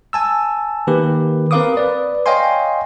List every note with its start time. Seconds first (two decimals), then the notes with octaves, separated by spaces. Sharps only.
0.13 G#5 A5 E6
0.87 D#3 A#3 G4 B4
1.51 C4 A#4 B4 F5 D6 D#6
1.77 B4 D5
2.26 C#5 D#5 F5 G5 G#5 C6